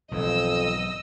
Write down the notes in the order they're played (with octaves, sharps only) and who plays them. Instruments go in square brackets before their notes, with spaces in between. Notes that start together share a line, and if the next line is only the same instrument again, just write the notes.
[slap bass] B1 G#2 E3 [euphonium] F2 [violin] D#5 E6